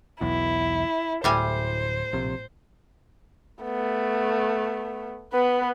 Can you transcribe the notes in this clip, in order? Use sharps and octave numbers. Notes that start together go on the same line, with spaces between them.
E1 B1 E2 E4
D1 A2 G3 C5 G#5
A#1 C3
A3 B3
B3 B4